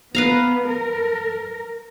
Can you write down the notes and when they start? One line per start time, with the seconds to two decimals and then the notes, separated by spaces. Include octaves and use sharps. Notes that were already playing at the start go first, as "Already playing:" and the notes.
0.15 B3 B4 F5 A#5
0.68 A#4